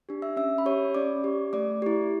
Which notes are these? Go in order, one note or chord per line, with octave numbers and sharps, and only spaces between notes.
D4 G4
E5 E6
C#4 E5 E6
B5
G4 C#5 C#6
C#4 D5 D6
G4
A3 D5 D6
E4 G4